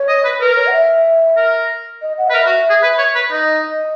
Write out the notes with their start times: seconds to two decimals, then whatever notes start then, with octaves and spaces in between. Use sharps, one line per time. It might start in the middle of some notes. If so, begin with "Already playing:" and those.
Already playing: C#5
0.08 D#5
0.25 B4
0.40 A#4 B4
0.56 C#5
0.67 F#5
0.72 E5
1.37 A#4
2.02 D#5
2.18 F#5
2.28 B4 D#5
2.33 A#4 E5
2.46 F#4
2.70 G#4
2.83 B4
2.98 C#5
3.15 B4
3.31 D#4 D#5